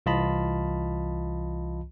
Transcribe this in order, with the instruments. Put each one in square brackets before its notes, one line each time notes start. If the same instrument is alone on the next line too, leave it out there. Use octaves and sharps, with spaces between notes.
[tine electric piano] C2 E3 F4 D#5 A5 B5